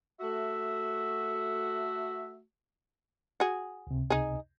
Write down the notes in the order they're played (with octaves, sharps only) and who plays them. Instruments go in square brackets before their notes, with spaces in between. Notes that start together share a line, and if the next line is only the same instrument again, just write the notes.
[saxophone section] A3 F#4 [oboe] E5
[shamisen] F#4 G#4
[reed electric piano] C#2 C3
[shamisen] D#4 G#4